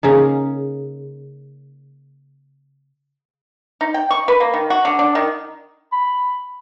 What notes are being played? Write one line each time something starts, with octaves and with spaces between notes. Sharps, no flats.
C#3 A#3 D#4
D#4
G5
C#6
B4
A#3
D#3
F#4
D3
D4
D#3
B5